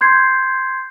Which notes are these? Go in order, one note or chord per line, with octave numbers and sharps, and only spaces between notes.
C6 G6 G#6 C7